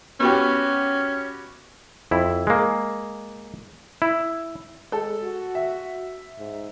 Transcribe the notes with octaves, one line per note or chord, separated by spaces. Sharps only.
B3 C#4 F#4 G4
F2 E4
G#3 A#3
E4
G#3 A4
F#4
E5
G#2